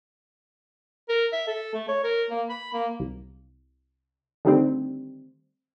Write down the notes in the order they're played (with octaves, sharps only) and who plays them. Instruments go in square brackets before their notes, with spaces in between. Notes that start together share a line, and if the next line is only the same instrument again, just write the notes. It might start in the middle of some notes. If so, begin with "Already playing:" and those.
[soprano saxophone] A#4
E5
A4
A3
C#5
A#4
A#3
B5
A#3
[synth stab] C2
D3 D#3 G3 A3 C4